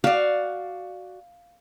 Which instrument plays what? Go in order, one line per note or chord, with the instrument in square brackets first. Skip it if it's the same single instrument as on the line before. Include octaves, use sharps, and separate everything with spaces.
[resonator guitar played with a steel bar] F#4 D5 [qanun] F5